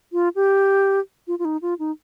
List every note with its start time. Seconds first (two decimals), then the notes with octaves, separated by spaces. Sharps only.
0.13 F4
0.36 G4
1.28 F4
1.39 F4
1.45 D#4
1.62 F4
1.79 D#4